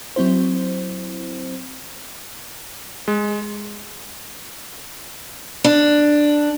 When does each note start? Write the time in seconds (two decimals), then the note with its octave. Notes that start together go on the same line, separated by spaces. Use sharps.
0.16 F#3 C4 E4 C5
3.08 G#3
5.64 D4